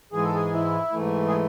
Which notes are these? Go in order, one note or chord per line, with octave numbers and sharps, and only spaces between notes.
G#2 E3 G#3 G#4
A4
G#4
E4
G#2 E3 A3
G#4